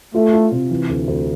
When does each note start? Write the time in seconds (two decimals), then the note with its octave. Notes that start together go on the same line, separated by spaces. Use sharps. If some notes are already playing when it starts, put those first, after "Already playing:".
0.15 A3 F4
0.33 F4
0.52 C3
0.71 E3
0.89 D2
1.08 D2